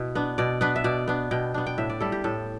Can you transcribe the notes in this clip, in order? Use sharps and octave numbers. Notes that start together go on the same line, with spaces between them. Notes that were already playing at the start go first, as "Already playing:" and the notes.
Already playing: B2 E4
B3 D4
B2 D5
B3 D4 B4
E5
B2 D5
B3 D4
B2 G5
B3 D4
G5
A2 E5
D5
G3 E4 A4
G4
A2 A4